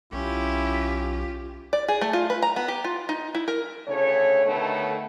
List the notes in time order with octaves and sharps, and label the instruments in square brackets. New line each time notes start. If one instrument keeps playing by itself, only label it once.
[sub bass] B1 [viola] C#4 [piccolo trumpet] E4 [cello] F4 G4
[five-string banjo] D5
G#4
A3
F4
B4
A#5
B3
G4
F4
D#4
E4
A#4
[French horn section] D2 C#3 A3 C#5
B2 D3 D#3 A3 B3 A4